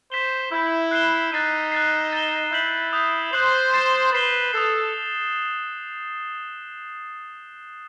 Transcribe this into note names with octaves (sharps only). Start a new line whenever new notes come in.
C5 G6 B6 E7 G7
E4 E6 G6 B6
F#6 C7 E7 G7
D#4 F#6 A6 C7 D#7
F#6 A6 C7
A6 E7 G7
E4 G6 B6 F#7
D#6 G6 C7
C5 D#6 F#6 C7 F#7
A6 C7 E7
B4 A6 C7 E7 G7
A4 D#6 A6 C7